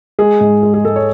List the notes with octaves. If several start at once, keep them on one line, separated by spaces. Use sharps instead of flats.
G#3 G#4
G#2
G#3
G#4
G#2 A4
C#5